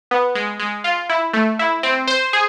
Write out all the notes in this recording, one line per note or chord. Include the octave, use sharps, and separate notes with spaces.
B3
G#3
G#3
F4
E4
A3
E4
C4
C5
G#4